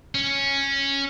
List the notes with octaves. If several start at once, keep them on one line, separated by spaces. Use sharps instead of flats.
C#4